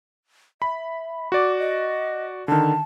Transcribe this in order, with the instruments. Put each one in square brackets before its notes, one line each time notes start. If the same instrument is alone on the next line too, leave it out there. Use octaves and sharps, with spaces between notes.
[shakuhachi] E5 [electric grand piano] B5
[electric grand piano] F#4 D5 [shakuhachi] D6
[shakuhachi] D#5
[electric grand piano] D3 D#3 [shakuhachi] A5